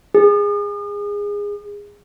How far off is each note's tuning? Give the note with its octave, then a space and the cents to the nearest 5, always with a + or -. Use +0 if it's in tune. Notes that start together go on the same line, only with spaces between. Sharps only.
G#4 -20